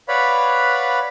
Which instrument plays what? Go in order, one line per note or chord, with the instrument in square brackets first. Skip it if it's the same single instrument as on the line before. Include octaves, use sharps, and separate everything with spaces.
[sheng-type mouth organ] B4 C#5 D5 F5 F#5 B5